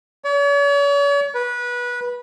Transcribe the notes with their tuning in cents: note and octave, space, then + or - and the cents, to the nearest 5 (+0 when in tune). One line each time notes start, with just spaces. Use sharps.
C#5 +45
B4 -20